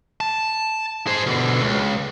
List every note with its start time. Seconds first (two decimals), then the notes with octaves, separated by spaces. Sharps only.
0.21 A5
1.07 G#4 C5
1.27 B2 D3
1.63 C#2